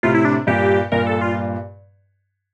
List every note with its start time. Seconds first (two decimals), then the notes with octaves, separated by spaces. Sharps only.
0.03 A2 C3 F4
0.15 E4
0.25 D4
0.47 G2 A#2 G4
0.92 G2 A#2 A#4
1.07 A4
1.21 F4